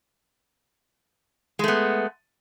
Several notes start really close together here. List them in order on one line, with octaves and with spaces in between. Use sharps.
G#3 A3 B3